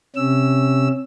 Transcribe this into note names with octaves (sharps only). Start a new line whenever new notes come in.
C3 C#4 E6